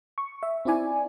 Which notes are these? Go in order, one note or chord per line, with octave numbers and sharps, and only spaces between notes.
C#6
E5
C4 D#4 E4 D5 G#5